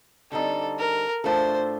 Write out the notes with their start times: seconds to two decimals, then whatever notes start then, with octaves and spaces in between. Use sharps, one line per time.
0.31 D3 G3 C4 D#4 A4
0.78 A#4
1.24 A2 A3 D4 F4 A4 C5